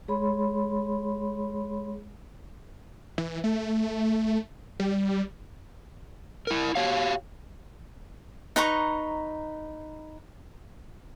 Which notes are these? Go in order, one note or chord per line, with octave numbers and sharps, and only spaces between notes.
G#3 G#4 C#5 B5 C6
E3
A3
G3
E4 A#4
F#4 G4 C#5 F5
D#4 B4 A#5 C#6